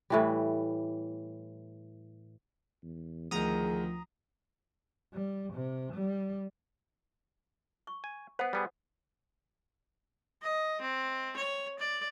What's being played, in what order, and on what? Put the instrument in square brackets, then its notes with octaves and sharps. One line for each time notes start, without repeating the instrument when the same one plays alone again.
[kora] A2 E3 G3
[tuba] E2
[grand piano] D2 D#3 [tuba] F3 [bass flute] G#4 [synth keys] A#5 D#6
[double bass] G3
C3
G3
[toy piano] C#6
[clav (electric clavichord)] G#5
[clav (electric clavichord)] B3 B4 [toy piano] C5 F#5
[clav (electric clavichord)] G3 B3 G#4
[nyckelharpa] D#5
C4
C#5
D5